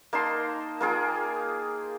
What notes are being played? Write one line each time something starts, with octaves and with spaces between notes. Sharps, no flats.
A#3 D#4 A5 C6
A#3 F4 G#4 G5